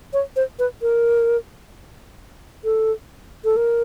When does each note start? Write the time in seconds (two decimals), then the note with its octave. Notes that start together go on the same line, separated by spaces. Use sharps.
0.13 C#5
0.36 C5
0.59 B4
0.82 A#4
2.64 A4
3.44 A4
3.57 A#4